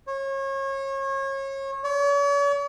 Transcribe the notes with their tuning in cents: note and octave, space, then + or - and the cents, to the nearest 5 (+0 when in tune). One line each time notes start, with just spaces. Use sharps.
C#5 -30
C#5 +45